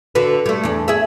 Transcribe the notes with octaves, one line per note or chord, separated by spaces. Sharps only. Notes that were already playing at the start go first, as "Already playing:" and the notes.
D3 F#4 B4
G3 A3
E2 D4
G#4 E5